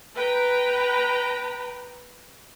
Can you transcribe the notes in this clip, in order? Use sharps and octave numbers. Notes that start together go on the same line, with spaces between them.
B4 G5 A#5